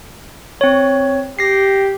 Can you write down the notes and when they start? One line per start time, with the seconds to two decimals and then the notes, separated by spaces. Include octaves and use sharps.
0.61 C4 C#5
1.39 G4 A#6 C7